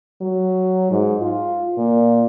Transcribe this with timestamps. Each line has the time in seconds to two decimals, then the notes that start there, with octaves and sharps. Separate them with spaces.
0.21 F#3
0.91 G#2
1.21 F4
1.78 A#2